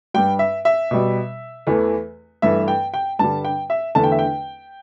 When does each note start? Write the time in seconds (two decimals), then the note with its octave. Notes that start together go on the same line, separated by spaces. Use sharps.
0.14 G2 G3 G5
0.39 E5
0.65 E5
0.91 B2 G3
1.67 E2 E3 A3
2.42 G2 E3 A3 E5
2.68 G5
2.94 G5
3.19 G2 D3 G3 A5
3.45 G5
3.70 E5
3.95 E2 D3 A3 A5
4.04 G5
4.12 E5
4.19 G5